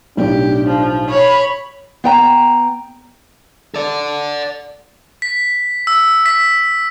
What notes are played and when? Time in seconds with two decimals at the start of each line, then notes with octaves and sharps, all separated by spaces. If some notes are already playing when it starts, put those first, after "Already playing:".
0.17 B1 A2 D4 G4
0.67 F3
1.10 C#5 B5
2.04 B3 G5 A#5
3.74 A4 D5
5.22 B6
5.87 E6
6.26 B6